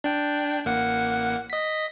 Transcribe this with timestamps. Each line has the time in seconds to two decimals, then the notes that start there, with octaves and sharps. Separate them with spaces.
0.04 D4 G5
0.65 A1 A#3 F#5
1.50 D#5 B6